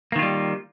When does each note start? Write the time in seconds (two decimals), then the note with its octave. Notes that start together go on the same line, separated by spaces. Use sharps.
0.12 A#3
0.16 D#3
0.19 F4
0.22 G3